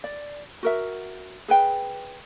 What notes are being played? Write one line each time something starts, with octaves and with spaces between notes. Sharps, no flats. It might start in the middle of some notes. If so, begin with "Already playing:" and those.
D5
F#4 A#4 E5
G#4 B4 G5